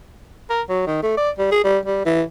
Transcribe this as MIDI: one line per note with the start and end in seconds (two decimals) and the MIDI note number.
0.50 0.62 70
0.69 0.83 54
0.87 1.00 51
1.03 1.13 57
1.17 1.30 74
1.38 1.49 55
1.51 1.62 68
1.64 1.79 55
1.85 2.03 55
2.05 2.22 52